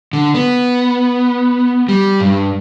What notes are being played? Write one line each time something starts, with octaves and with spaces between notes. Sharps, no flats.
D3
B3
G3
G2